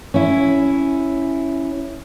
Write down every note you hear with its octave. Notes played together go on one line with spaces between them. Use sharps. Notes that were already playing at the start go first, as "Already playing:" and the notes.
C#4 E4